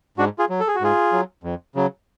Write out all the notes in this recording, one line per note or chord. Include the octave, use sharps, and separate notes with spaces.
G#2 D4 F#4
F4 G#4
F#3
A4
G#4
F#4
G#2 F4 G#4
F#3
F2
C#3 F#3